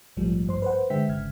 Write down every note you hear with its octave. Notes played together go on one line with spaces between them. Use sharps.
A#1 G#2 F3 G3 A3
G#1 G2 C5 C6
B4 C5 F#5
D3 G#3 E5 G5 B6
G1 C#3 F6 G#6